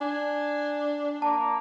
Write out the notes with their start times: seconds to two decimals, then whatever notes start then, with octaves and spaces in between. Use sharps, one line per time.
0.01 D4 G#5
1.22 A#3 A5
1.37 A#3